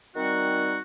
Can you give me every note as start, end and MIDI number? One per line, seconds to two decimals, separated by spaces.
0.16 0.79 51
0.16 0.79 55
0.16 0.79 60
0.16 0.79 63
0.16 0.79 66